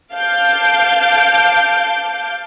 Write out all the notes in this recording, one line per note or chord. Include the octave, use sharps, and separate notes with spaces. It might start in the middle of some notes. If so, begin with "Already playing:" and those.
F5 A5 D6 G6 D7